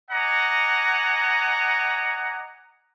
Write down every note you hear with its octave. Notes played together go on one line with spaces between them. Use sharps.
D5 D#5 F#5 G#5 A#5